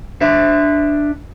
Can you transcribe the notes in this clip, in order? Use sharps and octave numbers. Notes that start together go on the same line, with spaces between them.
D4 E5